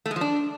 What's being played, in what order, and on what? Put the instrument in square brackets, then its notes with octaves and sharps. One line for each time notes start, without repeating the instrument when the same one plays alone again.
[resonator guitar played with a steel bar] A3
G#3
F3
D4